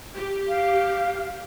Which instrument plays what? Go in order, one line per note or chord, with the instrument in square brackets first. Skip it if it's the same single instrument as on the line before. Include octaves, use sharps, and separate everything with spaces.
[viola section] G4
[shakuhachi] F5